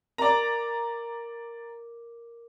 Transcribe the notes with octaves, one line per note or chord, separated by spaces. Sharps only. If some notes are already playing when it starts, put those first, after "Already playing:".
A#4 D5 A#5 D6